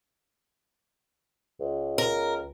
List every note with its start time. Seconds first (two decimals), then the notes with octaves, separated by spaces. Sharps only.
1.60 C#2
1.98 A#4